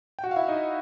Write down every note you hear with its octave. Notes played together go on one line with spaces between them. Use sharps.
G5
F#4 F#5
F5
E4 E5
D#4 D#5